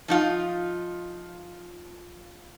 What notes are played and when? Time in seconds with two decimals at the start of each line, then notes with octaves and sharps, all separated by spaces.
0.08 F3 D#4 F4